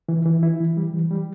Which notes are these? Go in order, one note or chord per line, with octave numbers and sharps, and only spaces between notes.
E3
E3
E4
E3
G3
E3
G3